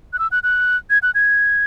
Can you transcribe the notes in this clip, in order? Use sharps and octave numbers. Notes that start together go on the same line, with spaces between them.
F#6
E6
F#6
F#6
G#6
F#6
G#6